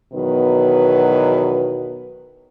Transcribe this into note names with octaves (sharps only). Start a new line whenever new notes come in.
E2 B2 D#3 F#3 B3 B4